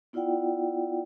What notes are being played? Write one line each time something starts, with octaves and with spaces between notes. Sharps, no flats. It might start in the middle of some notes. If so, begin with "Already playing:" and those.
B3 E4 F4 D5 F#5 G5